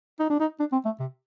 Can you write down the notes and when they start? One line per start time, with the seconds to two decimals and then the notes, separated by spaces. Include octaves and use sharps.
0.20 D#4
0.30 D4
0.40 D#4
0.59 D4
0.72 C4
0.85 A3
1.00 C3